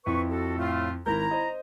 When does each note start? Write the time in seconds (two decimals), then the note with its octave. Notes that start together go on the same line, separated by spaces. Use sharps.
0.06 F2 E4 B4 C#6
0.30 F#4 A4
0.58 A2 A3 F4
1.06 G#1 E4 A#4 A#5 G6
1.31 C5 D#5